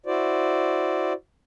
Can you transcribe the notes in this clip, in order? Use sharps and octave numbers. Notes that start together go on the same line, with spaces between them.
E4 F#4 C5 D5